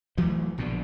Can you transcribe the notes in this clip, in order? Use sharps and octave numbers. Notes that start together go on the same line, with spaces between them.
E3 F#3 A3
A#1 B2 D3